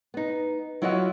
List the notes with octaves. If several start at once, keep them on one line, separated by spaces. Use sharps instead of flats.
B3 D#4
F#3 E4 F4 D#5 E5 F#5